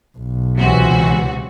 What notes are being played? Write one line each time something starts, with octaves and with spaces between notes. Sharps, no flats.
B1
C#2 C3 E3 F#4